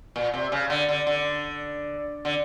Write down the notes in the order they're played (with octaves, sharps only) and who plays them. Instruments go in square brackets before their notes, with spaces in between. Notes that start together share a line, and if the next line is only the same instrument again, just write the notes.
[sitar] A#2
C3
C#3
D3
D3
D3
D3